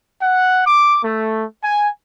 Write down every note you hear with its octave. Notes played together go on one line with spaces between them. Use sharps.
F#5
D6
A3
G#5